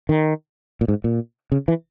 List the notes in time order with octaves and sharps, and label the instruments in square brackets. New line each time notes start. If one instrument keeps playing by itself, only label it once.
[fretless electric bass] D#3
A#2
G#2
A#2
C#3
E3